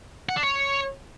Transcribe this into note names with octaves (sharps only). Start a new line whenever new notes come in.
F#5
D4
C#5